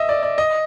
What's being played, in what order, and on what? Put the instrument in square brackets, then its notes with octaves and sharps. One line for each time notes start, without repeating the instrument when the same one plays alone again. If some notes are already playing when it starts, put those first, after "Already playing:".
Already playing: [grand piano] D#5 E5
D5
D5
D#5